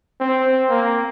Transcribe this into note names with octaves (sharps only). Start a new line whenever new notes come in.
C4
A#3